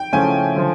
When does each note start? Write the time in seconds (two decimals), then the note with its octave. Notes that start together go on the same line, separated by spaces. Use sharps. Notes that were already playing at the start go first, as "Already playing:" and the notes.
Already playing: G5
0.13 C#3 F3 A3 C#4 E4 G#5
0.56 D3 F3